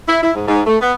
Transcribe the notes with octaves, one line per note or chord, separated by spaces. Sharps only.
E4
E4
G#2
G#2
A3
B3